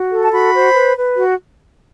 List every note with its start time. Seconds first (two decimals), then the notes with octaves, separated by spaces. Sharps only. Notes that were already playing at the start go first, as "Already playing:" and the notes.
Already playing: F#4
0.10 A4
0.23 A5
0.32 F#4 B5
0.53 C5
0.74 B4
0.96 B4
1.17 F#4